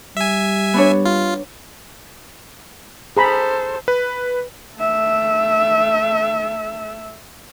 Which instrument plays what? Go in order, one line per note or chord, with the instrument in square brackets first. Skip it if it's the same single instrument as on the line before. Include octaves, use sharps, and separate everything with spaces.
[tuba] G3 [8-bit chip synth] E5 G#5
[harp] B3 D4 C#5
[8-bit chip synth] F4
[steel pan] G#4 A#5 B5 [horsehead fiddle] A4 C5
[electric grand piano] B4
[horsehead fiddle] A3 E5